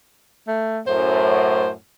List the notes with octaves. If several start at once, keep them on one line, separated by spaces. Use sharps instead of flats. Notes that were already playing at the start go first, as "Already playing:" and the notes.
A3
F#2 A2 C5